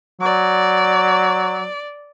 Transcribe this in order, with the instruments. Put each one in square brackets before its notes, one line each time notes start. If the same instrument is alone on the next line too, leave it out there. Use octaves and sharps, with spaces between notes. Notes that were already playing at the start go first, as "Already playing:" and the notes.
[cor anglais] F#3 [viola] D5